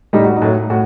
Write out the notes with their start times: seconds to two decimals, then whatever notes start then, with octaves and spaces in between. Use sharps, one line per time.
0.13 A2 G3 D#4
0.24 F#4
0.36 D#4
0.42 A2 F#3 A3
0.70 A2 F#4